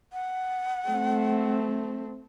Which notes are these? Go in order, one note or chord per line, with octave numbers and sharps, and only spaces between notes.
F#5
A3 C4